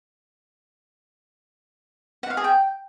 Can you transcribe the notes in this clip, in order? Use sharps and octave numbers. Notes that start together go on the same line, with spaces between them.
F#5
F5
G#4
G5